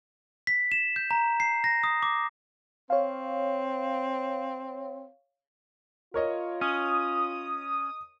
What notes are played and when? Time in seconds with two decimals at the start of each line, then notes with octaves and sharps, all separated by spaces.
0.47 B6
0.72 E7
0.96 G6
1.11 A#5
1.40 C7
1.64 A#6
1.84 D#6
2.03 D6
2.90 C4 C#5 F5
6.14 F4 A#4 C#5 D#5
6.61 C#4 D#6